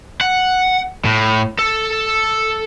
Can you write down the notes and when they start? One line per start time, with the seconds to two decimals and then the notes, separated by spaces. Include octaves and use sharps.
0.21 F#5
1.05 A2
1.59 A4